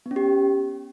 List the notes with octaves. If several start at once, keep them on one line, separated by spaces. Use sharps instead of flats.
B3
C#4
G4